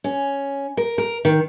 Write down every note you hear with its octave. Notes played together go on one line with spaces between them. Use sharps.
C#4
A#4
A#4
D#3